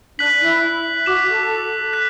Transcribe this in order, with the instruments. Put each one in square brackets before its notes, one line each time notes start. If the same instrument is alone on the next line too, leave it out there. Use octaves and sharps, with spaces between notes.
[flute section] D4 [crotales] F#6 B6 F#7
[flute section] E4
[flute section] F#4 [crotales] D6 B6 E7
[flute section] A4
[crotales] F#6 B6